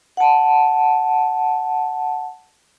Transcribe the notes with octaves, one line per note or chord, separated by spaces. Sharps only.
F#5 A5